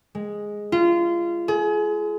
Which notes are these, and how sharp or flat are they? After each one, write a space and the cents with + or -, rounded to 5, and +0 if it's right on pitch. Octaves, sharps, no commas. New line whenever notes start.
G#3 +0
F4 -25
G#4 +30